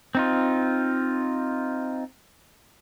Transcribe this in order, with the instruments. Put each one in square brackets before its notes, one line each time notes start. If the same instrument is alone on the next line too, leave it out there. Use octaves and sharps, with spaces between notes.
[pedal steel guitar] C4 D#4 F4